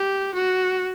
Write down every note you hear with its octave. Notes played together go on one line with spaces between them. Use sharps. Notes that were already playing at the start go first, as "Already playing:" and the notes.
Already playing: G4
F#4